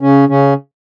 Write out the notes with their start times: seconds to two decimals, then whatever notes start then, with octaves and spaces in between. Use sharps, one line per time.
0.01 C#3 C#4
0.29 C#3 C#4